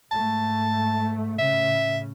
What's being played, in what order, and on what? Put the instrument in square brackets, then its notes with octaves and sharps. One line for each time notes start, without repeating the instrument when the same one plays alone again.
[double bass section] G#2 A3 [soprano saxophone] A5
[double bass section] A2 C#3 [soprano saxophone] E5